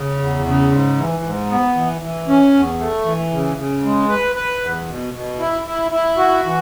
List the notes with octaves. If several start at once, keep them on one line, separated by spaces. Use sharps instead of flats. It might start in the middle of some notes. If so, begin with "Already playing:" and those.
Already playing: C#3
E2
C#3
G#2
E3
G#2
B3
E3
E3
C#4
E2
A3
E3
C#3
C#3
G#3
B4
B4
E2
B2
B2
E4
E4
E4
F#4
E3